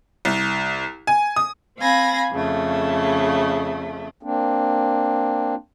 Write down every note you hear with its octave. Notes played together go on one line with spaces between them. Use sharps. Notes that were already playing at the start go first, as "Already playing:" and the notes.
C2
G#5
D#6
C4 F5 G#5 B5 A#6
F2 C#3 A3
A#3 C4 D4